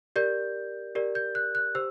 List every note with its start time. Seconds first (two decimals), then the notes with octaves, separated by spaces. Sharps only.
0.16 G4 A#4 D5 G6
0.95 G4 A#4 D5
1.15 G6
1.35 F#6
1.55 F#6
1.75 G4 C5 E6